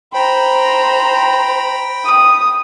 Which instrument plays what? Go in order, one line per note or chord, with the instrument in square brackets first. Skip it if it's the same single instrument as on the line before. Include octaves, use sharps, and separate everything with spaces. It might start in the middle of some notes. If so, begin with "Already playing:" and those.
[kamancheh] C5 A#5 [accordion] G5 B5
[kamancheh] D#6